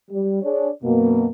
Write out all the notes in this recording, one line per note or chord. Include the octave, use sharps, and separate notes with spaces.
G3
D4 G#4 C#5 D5
F#2 B2 A#3